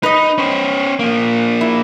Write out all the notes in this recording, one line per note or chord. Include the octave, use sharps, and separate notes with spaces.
D#4 B4 D#5
C#4 C5
F3 A#3
E4